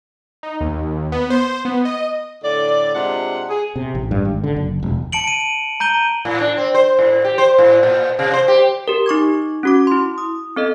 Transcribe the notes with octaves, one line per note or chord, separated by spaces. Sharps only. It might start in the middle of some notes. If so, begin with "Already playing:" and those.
D#4
D#2
B3
C5
B3
D#5
A2 D3 D5
C3 G#3 D4 F4 F#5
G#4
C3
A1
G2
G#1
D3
F#1
E1
A5 C#7 D7 F#7
D7 D#7
A#5 G6 D#7 G7
A2
D4
C4
C5
A2
G4
C5
A2
A#2
C3
C5
G4
G4 A#4
D#4 C#6 D6 G#6
C#4 F#4 D6
E4 C6
D#6
C4 A4 D#5